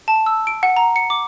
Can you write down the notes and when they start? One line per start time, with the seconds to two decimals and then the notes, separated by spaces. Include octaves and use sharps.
0.08 A5
0.26 E6
0.47 D7
0.63 F#5
0.77 A#5
0.96 C#7
1.10 D6